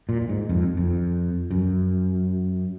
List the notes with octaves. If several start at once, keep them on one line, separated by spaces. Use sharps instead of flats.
A#2
A#2
G#2
F2
F2
F#2